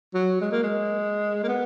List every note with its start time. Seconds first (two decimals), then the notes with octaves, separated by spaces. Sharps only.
0.14 F#3
0.41 G#3
0.52 A#3
0.64 G#3
1.43 A#3
1.48 B3